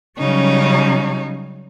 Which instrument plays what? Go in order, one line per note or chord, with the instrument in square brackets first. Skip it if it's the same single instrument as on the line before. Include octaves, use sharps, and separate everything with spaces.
[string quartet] C#3 F#3 G3 C#4 D#4 C#5